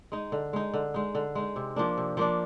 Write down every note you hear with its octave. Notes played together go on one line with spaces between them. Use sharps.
G#3 D#4
D3
G#3 D#4
D3
G#3 D#4
D3
G#3 D#4
C3
F3 A#3 D4
C3
F3 A#3 D4